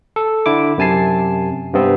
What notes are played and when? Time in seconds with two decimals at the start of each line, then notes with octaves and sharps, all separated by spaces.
0.16 A4
0.46 D3 E4 D6
0.78 F#2 C3 G#5 A5 C7
1.73 G2 C3 B3 C4